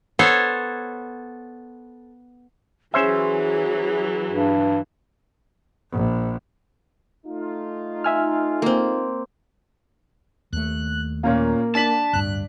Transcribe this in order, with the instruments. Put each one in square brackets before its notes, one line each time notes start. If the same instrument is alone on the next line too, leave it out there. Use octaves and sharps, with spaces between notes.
[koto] B3 A4 C5 C#5
[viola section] E3 F#3 [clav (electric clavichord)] C#4 C5 E5 [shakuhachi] G#4
[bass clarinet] G2
[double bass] A#1
[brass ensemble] A3 D#4 F4
[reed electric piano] E5 G#5 F6
[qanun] A#3 C4
[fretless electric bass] D#2 A3 [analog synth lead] F#6
[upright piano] A#2 C#4 F4 [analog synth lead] A#3
[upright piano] D4 B6 F#7 [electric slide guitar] A5
[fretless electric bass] D1 G2 [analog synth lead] F#6